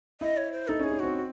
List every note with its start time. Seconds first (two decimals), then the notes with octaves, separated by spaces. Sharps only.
0.21 E4 D#5
0.37 C#5
0.52 C5
0.68 D#4 A4
0.79 C#4
0.84 G#4
0.92 C#4
0.99 C4 F#4
1.16 F#4